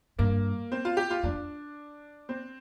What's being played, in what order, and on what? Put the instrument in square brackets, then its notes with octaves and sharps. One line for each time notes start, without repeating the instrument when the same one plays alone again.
[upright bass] G2 [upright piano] A#3
[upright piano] C4
F4
G4
F4
[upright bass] F2 [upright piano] D4
[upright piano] C4